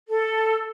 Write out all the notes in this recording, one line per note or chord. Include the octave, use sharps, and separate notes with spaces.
A4